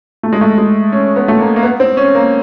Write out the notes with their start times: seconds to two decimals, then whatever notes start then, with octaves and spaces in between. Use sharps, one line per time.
0.23 A3
0.33 G#3
0.41 A3
0.58 G#3
0.92 C#4
1.16 B3
1.28 A3
1.40 A#3
1.56 A#3
1.63 B3
1.80 C4
1.97 C#4
2.15 A#3